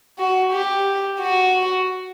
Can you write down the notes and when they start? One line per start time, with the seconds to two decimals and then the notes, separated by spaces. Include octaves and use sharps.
0.18 F#4
0.52 G4
1.20 F#4